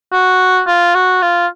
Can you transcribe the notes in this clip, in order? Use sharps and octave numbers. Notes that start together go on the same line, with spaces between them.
F#4
F4
F#4
F4